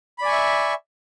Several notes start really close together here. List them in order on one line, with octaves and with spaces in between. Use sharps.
B5 D5 G#5 C#6 E5